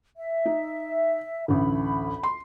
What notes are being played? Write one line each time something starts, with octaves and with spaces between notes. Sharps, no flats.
E5
D#4
A1 D2 B5
C6